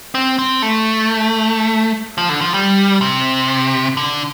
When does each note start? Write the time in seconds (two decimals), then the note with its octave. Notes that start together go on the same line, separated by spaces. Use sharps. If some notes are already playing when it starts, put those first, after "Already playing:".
0.15 C4
0.39 C4
0.62 A3
2.18 F3
2.29 D3
2.41 F3
2.54 G3
3.01 C3
3.97 D3